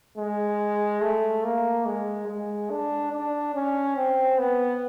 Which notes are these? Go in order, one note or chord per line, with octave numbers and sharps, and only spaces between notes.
G#3
A3
A#3
G#3
G#3
D4
D4
C#4
C4
B3